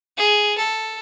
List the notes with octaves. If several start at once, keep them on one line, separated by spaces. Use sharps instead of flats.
G#4
A4